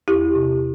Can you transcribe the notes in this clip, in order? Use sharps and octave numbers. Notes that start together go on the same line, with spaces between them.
E2 E4 G4
C3